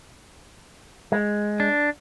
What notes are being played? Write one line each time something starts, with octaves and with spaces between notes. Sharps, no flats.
G#3
D4